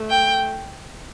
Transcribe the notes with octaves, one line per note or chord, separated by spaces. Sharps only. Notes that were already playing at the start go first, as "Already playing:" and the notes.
Already playing: A3
G5